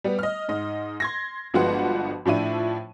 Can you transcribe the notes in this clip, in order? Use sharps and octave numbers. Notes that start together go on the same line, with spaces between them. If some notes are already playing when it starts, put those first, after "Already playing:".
G3 B3
D#5 F6
G#2 D#5
C6 G#6 A#6
G1 F3 G#3 B3 F#4 F#5
A2 F3 D4 E4 D#7